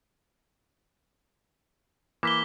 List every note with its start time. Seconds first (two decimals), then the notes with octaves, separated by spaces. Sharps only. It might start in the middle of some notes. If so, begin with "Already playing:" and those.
2.23 E3 A#3 D6 B6 G7